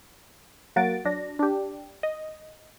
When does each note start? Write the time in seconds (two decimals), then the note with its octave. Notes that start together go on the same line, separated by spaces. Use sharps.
0.76 F#3 A#3 F#4 A6 D7
1.05 F#3 D4 A#6
1.39 D4 G4
2.03 D#5